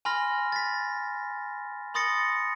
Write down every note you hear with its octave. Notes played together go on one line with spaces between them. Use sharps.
G#5 B5 C6 F6 A#6
A6 B6
B5 C6 D#6 A6 A#6 C#7